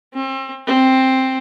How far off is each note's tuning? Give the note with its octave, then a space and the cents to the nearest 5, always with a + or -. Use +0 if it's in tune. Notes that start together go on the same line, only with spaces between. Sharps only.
C4 +35
C4 +5